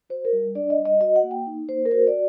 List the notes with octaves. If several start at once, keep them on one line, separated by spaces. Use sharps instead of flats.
F#4 C5
A#4
G3
D4 D5
D#5
G3
D#5
F#4 D#5
F#5
A#3
G5
D#4
A#3 C5
A#4
F#4 C5
D5